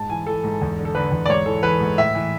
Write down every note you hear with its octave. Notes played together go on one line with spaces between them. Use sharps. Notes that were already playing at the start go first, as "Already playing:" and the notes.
Already playing: G#2 A5
E3 G#5
E3 A4
G#2
E2
D3
A4
D3 B4
E2
D5
G#2 C#5
E3 A4
E3 B4
G#2
A2 E5
E3